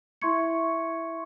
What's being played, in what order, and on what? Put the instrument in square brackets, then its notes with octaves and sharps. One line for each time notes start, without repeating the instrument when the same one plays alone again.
[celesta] E4 E5 C6 C#6 G#6 C#7